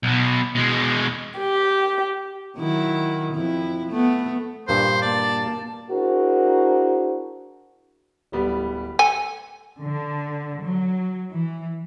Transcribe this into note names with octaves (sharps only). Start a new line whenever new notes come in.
B1 B2
B2 G#3
G4
D#3 F#3 E4
F2 E4
A3 B3
G2 A#2 B4 C5
A#3 D5 A5
D4 E4 F#4 G#4 A#4 C5
D1 G3 B3
A4 G#5
D3
F#3
E3